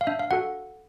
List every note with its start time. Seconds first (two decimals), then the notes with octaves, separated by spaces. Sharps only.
0.01 F5
0.07 D4 E5
0.19 F5
0.31 F#4 A4 F#5